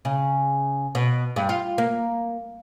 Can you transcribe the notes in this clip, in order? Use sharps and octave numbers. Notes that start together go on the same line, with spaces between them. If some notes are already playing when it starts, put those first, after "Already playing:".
C#3
B2
G2
F4
A#3